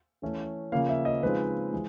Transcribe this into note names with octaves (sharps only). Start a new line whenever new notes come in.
E3 A3 C#4
C#3 F3 A#3 F5
E5
D#5
C#3 F3 G#3 C4 D#4 B4
E3 G#3